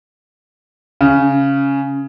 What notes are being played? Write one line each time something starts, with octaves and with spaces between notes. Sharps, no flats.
C#3